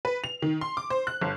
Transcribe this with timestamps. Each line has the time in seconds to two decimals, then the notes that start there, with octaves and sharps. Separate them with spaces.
0.05 B4
0.24 F7
0.42 D#3
0.61 C6
0.77 D6
0.90 C5
1.07 F#6
1.22 G1